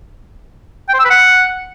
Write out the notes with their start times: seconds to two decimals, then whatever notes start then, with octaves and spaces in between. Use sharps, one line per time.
0.89 G5
0.94 C5
1.00 E6
1.05 B4
1.10 F#5